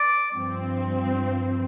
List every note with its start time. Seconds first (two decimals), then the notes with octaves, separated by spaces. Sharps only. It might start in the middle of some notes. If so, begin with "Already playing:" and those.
Already playing: D5
0.32 G2 F3 C4